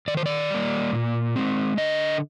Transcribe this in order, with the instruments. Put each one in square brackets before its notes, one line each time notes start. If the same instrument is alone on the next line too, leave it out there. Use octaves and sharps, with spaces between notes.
[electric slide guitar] D#3 D5
C5
D5
G3 A#3
A#2
G#3 C4
D3 D#5